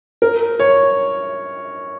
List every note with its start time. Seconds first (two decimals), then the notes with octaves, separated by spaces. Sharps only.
0.22 A#4
0.60 C#5